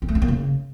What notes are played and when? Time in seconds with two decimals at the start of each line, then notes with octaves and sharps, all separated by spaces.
0.02 C4
0.08 A3
0.15 C#4
0.22 A#3
0.28 C#3